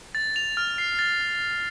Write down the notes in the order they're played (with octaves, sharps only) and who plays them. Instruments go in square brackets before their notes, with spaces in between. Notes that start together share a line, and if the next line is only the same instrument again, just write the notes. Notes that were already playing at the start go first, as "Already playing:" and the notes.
[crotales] A6
F7
F6
C7
A6